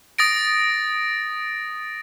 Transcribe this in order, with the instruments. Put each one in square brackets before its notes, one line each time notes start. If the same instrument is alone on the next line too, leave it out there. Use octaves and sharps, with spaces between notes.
[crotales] D#6 A6 A#6 D7